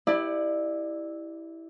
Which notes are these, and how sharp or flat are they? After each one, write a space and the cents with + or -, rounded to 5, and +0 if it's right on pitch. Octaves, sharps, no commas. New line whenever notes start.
E4 -10 G4 +0 D5 +25